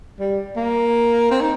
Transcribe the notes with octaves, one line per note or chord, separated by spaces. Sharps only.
G3
A#3
C4
D#4